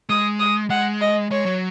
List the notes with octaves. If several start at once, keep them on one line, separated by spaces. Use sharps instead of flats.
G#3 D#6
D#6
G#3 F#5
D#5
G#3 C#5
F#3